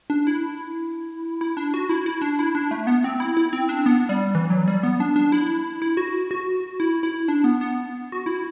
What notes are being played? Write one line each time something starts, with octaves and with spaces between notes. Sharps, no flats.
D4
E4
E4
D4
F#4
E4
E4
D4
E4
D4
A3
B3
C4
E4
E4
C4
D4
B3
G3
E3
F#3
G3
B3
D4
D4
E4
E4
F#4
F#4
E4
E4
D4
B3
B3
F#4
E4